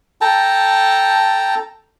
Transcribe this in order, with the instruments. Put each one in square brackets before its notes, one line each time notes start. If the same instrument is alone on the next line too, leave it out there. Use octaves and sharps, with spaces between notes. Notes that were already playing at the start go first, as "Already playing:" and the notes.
[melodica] A4 G5 A5 A#5